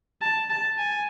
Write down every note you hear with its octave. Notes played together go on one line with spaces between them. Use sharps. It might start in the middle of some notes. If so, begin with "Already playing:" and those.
A5
A5
G#5